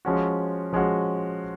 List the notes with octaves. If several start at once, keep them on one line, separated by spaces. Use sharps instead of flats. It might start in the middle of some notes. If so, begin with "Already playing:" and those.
F3 G#3 C#4 F#4
F3 G#3 C#4 F#4